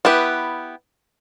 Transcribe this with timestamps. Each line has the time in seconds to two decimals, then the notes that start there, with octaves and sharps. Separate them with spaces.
0.05 B3 E4 G4 B4